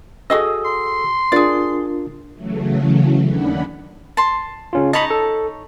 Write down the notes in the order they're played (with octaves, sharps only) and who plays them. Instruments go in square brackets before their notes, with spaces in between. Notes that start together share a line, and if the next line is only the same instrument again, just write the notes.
[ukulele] F#4 G#4 D#5 [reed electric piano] A4 E6
[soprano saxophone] C6
[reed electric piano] D4 F4 A#4 [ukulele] G#4 D5
[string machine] C#3 E3 F#3 A3
D#2 D#3 C#4 D4 F#5 B5
[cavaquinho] A5 C6
[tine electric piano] C#3 C#4 F4
[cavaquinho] D#4 C#5 A5 [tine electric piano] D#5 B5
[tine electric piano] A4